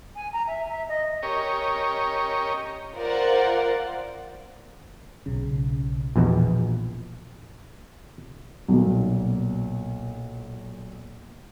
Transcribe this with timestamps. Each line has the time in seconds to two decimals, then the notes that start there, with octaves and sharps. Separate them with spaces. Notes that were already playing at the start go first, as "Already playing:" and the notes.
0.16 G#5
0.33 A#5
0.47 E5
0.69 E5
0.89 D#5
1.23 C#4 G4 A#4 C#5 D#5
2.96 F4 A#4 C5 D5 F5 F#5
5.26 B1 C#3
6.16 A#1 E2 B2
8.68 B1 A#2